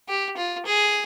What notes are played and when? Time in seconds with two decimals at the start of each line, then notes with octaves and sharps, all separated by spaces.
0.09 G4
0.37 F4
0.66 G#4